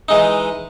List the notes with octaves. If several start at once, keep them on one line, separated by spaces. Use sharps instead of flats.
E3 G#3 D#4